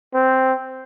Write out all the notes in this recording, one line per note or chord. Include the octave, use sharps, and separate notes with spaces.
C4